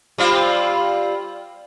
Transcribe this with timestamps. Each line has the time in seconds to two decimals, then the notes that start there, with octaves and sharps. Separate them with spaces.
0.18 G3 C4 F4